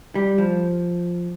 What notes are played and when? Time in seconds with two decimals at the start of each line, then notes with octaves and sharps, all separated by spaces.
0.15 G3
0.38 F3